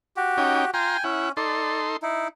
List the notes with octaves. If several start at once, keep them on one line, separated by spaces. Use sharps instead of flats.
F#4 G4
C#4 D#4 G5
F4 G5 G#5 A#5 C6
C#4 E4 F#5
D#4 A4 D5 C6
D#4 E4